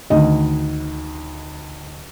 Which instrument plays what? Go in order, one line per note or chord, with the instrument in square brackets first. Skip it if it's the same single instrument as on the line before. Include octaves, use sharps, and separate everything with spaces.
[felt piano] D2 D#3 D#5